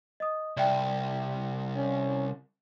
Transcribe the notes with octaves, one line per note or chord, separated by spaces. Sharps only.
D#5 D#6
C2 D5 E5 G5
C#4